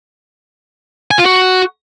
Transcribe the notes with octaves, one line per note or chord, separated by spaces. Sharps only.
G#5
F4
F#4